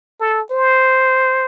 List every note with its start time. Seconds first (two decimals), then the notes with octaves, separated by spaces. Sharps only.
0.20 A4
0.51 C5